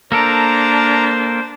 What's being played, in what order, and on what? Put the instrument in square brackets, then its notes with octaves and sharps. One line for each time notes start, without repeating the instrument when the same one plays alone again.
[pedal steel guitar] A#3 A4 A#4 [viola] D4 [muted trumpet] C5 [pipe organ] A#5